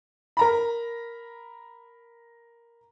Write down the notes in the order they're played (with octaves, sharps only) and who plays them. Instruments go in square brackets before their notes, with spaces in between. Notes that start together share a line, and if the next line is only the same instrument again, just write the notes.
[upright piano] A#4 A#5 B5